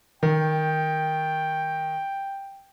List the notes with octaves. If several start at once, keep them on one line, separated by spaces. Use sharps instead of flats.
D#3 G5